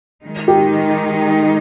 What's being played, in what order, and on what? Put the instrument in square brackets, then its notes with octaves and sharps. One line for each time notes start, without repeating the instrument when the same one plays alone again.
[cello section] D#3 G#3 D#4
[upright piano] G4